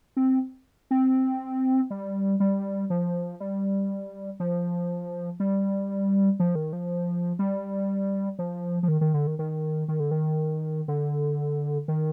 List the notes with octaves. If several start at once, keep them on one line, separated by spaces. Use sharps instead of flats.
C4
C4
G3
G3
F3
G3
F3
G3
F3
D#3
F3
G3
F3
F3
D#3
D#3
D3
D#3
D#3
D#3
D3
D#3
D3
D#3